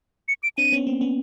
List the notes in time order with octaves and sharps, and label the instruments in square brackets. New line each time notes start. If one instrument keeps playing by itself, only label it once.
[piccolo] C#7
D7
[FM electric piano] C4 D4 [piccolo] D#7
[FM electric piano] B3 C#4
A#3 C4
B3 C#4